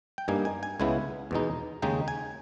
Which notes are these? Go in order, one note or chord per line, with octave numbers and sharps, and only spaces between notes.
G5
G2 G3 A#3 D#4 G#5
G#5
G#5
C#2 C#3 G#3 B3 E4 G#5
E2 B2 G#3 D#4
D#2 C#3 G#3 D#4 G5
G#5